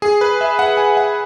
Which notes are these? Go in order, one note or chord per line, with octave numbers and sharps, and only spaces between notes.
G#4
B4
E5
F#5
G#5
F#5